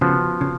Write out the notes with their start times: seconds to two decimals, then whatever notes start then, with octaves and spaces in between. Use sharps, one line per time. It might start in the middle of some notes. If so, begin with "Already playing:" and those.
0.01 C#3 F3 B3 F#4
0.41 C#3